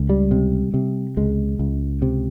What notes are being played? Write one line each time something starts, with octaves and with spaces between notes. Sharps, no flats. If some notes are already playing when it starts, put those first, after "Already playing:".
Already playing: C#2
G3
C3
C3
C#2 G#3
C#2
C3